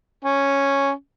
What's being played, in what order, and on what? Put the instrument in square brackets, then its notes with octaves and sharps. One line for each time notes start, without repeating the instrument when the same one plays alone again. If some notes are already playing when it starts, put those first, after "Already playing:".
[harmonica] C#4